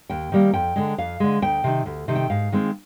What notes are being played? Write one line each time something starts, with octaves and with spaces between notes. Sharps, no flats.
D#2 G5
D#3 G3 A#3
F2 G5
D3 G#3
F2 F5
D3 G#3
D2 G5
C3 D#3
D2
C3 D#3
G5
G#2 F5
D#3 G#3 C4